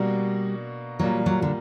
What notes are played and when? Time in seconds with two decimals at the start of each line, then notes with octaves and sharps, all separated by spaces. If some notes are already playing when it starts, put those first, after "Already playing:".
Already playing: B2 G3 A#3 D4 F#4
0.99 A#2 F#3 G3 A#3
1.26 F#3
1.42 D3